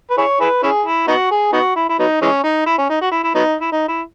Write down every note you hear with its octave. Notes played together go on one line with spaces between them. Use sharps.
B4
E4 G#4 C#5
E4 G#4 B4
C#4 E4 G#4
E4
B3 D#4 F#4
G#4
B3 D#4 F#4
E4
E4
F#3 B3 D#4
E3 G#3 C#4
D#4
E4
C#4
D#4
F#4
E4
E4
F#3 B3 D#4
E4
D#4
E4